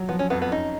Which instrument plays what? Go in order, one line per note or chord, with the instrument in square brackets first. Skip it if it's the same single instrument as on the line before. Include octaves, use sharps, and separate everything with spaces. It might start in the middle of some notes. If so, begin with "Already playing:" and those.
Already playing: [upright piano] F#3
[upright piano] F3 [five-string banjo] B3
[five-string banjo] C#4
[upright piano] F2 [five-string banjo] B3
[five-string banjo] B3
[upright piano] C#4 [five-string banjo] D#4